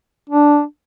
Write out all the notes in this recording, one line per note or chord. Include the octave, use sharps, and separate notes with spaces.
D4